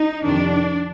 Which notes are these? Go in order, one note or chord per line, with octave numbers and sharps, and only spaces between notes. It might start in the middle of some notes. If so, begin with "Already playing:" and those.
Already playing: D#4
F2 C3 D#3 D4